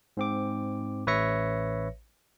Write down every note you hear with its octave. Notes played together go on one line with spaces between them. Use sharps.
G#2 C4 D6
A1 B4 C#5 E5 A#6 C#7